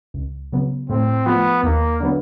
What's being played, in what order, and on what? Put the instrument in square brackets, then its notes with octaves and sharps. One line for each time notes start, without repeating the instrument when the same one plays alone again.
[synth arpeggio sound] C#2
C#3 F#3 B3
[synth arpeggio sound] A2 [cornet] C4
[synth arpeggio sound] F3 A3 [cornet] B3
[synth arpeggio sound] D#2 [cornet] A#3
[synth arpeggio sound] D3 F#3 B3